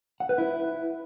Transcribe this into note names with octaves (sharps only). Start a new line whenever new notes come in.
F#5
B4
E4